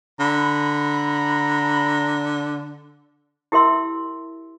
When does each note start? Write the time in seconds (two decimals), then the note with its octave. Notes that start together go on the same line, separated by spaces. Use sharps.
0.20 D3 A#5 B5
3.52 E4 G4 A#4 E5 C6 E6